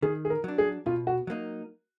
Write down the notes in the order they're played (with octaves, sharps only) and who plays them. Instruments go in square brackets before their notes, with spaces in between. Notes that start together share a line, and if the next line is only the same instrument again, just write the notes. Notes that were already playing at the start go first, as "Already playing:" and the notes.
[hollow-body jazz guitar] D#3 [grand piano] G#4
[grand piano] G#4
A#4
[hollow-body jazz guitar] F#3 D4
[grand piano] G#4
[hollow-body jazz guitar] B2 [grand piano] F4
[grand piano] F#4
[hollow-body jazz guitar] F#3 A#3 D#4